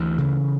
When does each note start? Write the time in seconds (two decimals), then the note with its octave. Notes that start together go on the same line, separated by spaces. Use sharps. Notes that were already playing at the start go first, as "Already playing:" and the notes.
Already playing: D2 E3
0.18 C#3